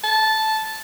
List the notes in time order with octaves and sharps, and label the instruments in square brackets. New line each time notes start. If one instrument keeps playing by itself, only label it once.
[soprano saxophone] A5